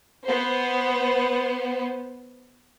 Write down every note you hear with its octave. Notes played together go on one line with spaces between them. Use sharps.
B3 C5